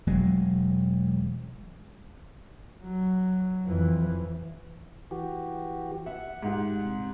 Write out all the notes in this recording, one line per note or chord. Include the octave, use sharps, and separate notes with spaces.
E1 F#3 G#3
F#3
F2 E3
E3 F#4 G4
E5 F#5
G#2 G4
C3